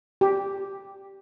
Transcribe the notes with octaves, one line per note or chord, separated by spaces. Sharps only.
G4